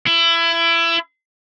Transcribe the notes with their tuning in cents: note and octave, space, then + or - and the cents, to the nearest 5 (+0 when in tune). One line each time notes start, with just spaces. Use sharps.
E4 +25